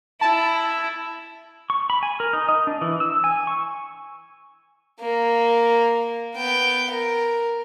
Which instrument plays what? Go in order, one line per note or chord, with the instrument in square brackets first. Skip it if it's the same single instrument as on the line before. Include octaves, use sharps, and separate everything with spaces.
[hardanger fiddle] E4 [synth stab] A5
[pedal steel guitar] C#6
B5
G#5
A#4
D#4
D#5
D4
E3
E6
G#5
C#6
[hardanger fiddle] A#3
B3 G5
A#4